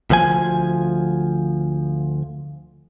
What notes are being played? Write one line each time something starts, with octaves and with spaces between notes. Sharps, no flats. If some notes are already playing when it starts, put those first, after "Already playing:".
D2 F3 G#5